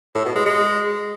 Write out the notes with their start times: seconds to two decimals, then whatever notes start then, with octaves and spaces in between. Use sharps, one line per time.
0.15 A2
0.25 B2
0.36 G#3
0.46 G#3